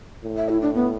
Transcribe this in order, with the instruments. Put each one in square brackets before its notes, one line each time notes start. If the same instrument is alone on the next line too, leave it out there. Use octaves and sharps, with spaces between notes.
[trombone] A2
[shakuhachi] E5
E4
D4
B3